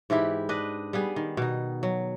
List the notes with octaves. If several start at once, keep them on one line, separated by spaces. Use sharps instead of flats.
G#2 E3 E4 G4
D4 B4 D#5
G3 B3 G#4
D#3
B2 D#4
F#3